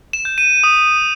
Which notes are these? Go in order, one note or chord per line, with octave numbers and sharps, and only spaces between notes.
E7
G6
D#7
D#6